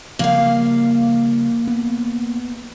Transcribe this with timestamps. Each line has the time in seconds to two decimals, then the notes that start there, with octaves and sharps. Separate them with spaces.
0.19 C#3 F3 G3 A#3 F5
1.67 B3